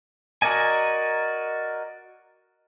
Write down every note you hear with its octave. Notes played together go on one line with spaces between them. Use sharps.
F#4 A#4 D5 D#5 G#5